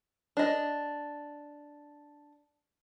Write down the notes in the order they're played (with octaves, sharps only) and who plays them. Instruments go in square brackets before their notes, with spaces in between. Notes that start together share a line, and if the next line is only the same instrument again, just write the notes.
[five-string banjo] D4 D#5